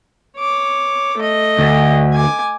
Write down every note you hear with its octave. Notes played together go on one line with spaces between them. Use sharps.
C#5 D6
A3 D#5
D2
G#5 D6